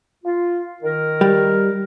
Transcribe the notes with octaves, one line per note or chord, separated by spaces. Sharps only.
F4
D#3 A#4
G3